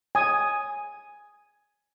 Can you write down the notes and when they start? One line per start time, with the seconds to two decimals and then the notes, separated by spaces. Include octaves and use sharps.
0.15 G#5 D#6